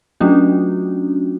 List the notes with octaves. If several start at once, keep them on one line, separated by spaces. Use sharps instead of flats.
F#3 A3 C#4 D4 F4 F#4